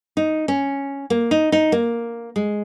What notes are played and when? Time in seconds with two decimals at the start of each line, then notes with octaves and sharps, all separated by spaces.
0.17 D#4
0.48 C#4
1.10 A#3
1.31 D#4
1.52 D#4
1.72 A#3
2.36 G#3